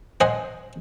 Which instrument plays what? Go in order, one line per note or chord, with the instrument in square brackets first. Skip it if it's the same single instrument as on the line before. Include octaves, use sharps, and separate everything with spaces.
[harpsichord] C5 D#5 F#5 G#5